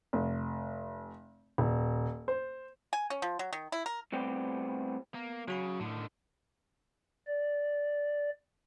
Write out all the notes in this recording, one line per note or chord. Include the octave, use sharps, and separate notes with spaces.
F1
D#1
C5
G#5
C#4
F3
F#3
D#3
E4
A#4
A2 G3 B3 C4 G4
A#3 B3
C#3 F#3 F#4 B5
A2 D3 D#3
D5